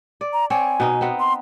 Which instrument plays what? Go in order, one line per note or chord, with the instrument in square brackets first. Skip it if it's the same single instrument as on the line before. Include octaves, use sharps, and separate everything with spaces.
[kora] D5
[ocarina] A#5
[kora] C4 C#5 D5 [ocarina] G#5
[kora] B2 D#4
B3 C4
[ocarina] C6